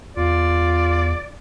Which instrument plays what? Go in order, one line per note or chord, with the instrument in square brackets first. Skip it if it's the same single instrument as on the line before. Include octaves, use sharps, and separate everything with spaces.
[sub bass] E2 [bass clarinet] F4 [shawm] D5